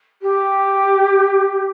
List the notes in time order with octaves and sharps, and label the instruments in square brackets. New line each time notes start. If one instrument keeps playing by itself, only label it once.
[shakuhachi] G4